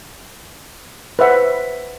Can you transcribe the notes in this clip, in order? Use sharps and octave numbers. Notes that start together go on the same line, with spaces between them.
B4 C5 E5 F#5